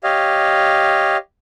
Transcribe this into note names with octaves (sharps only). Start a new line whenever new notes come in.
G4 C#5 D#5 F5